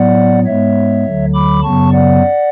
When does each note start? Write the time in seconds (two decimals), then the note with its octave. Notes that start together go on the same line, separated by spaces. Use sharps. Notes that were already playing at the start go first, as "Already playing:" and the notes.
Already playing: A2 F#3 B3 D5 F#5
0.46 G#2 G#3 B3 C#5 E5
1.05 D2 D3 F#3
1.34 B5 D6
1.63 F#2 C#3 F#3 B3 A5 C#6
1.92 D5 F#5